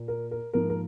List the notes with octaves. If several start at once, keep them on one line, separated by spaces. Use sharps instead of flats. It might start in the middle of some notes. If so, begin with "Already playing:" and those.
Already playing: A#2 A#3
A#4
A#4
G#2 F3 A#3 A#4
A#4